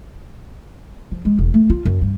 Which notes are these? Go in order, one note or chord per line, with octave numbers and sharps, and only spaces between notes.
F3
G#3
E1
A3
F4
F#2
G2